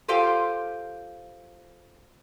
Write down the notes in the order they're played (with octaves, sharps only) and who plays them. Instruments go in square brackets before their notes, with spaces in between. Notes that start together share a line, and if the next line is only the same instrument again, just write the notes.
[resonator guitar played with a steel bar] F4 G4 A4 C5 F5 G5